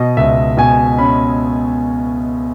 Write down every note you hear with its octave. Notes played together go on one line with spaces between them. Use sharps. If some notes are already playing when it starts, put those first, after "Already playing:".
Already playing: B2 D#5
C#2 E5
B2 G#5
C#4 B5